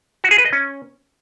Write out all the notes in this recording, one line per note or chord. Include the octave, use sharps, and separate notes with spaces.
F#4
G#4
B4
D#5
C#4